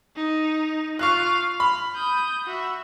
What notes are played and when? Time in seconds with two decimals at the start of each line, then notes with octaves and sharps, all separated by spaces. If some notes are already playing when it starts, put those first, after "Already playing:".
0.16 D#4
0.99 F4 F5 C#6 F#6
1.60 B5 F6
1.95 D#6 G6
2.46 F#4 E5